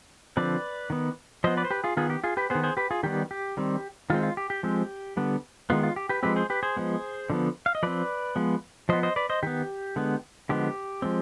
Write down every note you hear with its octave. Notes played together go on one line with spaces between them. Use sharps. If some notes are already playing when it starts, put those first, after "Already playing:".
D3 F3 C4 B4 D5
D#3 B3
F3 B3 C5 D#5
B4 D5
C5
G4 B4
F4 G#4
D#3 B3 F4 G#4
G4
F4 G#4
G4 B4
D#3 B3 G#4 C5
G#4 C5
G4 B4
F4 G#4
D#3 G3 B3 G4
G4
D#3 G3 C4
D#3 G#3 C4 F4
F4
G4
G4
F3 G#3 C4
D3 G3 B3
D#3 G#3 B3 F4
F4
G4
G4 B4
F3 G#3 C4 G4 B4
G#4 C5
G4 B4
G#4 C5
F3 G#3 B3
D3 F3 B3
F5
D#5
F3 C4 B4 D5
F3 G#3 B3
F3 B3 C5 D#5
C5 D#5
B4 D5
C5 D#5
D#3 B3 G4
D3 G#3 B3
D3 F3 G#3 B3 G4
F3 G#3 C4